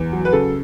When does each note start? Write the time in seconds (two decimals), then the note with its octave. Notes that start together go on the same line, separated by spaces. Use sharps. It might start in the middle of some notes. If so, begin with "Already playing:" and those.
Already playing: E2
0.13 F#3
0.25 B4
0.33 C#3 A4